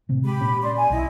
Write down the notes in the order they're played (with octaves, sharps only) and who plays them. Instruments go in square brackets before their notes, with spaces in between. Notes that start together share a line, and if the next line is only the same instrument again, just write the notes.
[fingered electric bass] A2 C3
[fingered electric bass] G#3 [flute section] G4 B5
[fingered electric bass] A#2 C#4
[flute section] D5 C6
G#5
[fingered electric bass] B1 [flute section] E4 D#5